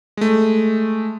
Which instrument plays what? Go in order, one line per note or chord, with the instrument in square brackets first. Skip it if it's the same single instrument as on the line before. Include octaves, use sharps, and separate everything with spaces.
[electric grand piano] G#3 A3